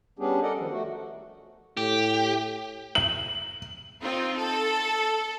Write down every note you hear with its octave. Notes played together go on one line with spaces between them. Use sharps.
G3 B3 C#4 D4 G4 G#4
A4 A#4 D5 D#5 F#5
D#3 F3
A3 F#4
A2 G4
F#7
C4 D#4 F4
A4